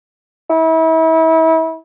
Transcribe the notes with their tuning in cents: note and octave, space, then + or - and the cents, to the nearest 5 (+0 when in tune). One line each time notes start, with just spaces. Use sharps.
E4 -35